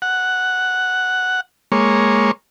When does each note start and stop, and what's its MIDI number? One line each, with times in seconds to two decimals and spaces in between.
0.02 1.41 78
1.72 2.31 56
1.72 2.31 58
1.72 2.31 73